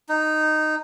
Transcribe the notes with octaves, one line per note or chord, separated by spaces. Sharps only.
D#4